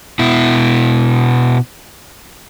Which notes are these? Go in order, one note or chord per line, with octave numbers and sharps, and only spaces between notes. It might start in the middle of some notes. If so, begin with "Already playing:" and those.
B2 E4